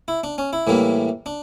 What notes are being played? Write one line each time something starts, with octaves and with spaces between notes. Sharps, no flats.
E4
D4
C#4
E4
A2 E3 G3 A#3
D4